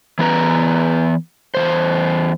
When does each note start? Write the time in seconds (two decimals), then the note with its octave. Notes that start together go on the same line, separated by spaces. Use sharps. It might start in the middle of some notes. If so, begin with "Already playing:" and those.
0.19 E3 B3 B4 A#5
1.55 E2 D#3 C5